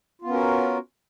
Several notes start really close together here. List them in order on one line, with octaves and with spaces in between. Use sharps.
F4 B3 C#4 A#4 F#4